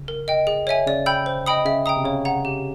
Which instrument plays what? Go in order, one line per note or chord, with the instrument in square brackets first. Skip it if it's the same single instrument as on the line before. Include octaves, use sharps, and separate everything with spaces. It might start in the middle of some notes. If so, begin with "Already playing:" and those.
Already playing: [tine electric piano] C#3
[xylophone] A#4
D#5 G5
G#4
C#5 E5 G#5
[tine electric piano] C#3 [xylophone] D5
[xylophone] G5 B5 E6 G6
C5
D#5 G5 B5 D#6
[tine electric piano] C#3 [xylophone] E5
[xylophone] G5 A#5 D#6
[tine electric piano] C3
[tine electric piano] C#3 [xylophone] C#5
[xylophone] F#5 A#5
G4